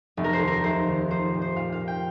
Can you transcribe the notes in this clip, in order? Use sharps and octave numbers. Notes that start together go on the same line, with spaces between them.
F1
A#4
C5
D#2
A#4
F1 C5
D#3
F3 C5
A#2
C5
A#2 F5
F5
A#2
G5